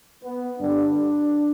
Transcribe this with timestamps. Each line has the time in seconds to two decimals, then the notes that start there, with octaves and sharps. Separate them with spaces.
0.23 B3
0.59 G2 D3 G3 D4